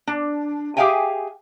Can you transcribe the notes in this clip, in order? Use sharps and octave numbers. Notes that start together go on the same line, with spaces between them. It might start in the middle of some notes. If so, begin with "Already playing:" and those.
D4
G4 G#4 E5 F5 G5 G#5